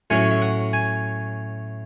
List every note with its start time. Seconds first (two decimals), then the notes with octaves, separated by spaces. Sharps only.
0.10 A2 F#3 C#4 G#5
0.31 E5
0.42 F#5
0.73 G#5